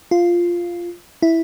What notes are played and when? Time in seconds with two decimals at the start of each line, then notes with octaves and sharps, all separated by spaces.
0.11 F4
1.22 E4